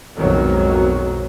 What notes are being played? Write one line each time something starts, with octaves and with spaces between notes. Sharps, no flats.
B1 F2 G#2 D#3 F#3